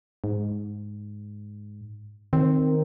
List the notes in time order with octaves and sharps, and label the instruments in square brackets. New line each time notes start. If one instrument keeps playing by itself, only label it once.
[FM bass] G#2
[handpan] D#3 [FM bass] C4